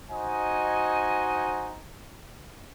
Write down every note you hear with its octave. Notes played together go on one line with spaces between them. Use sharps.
D#4 F#4 C5 D#5 G#5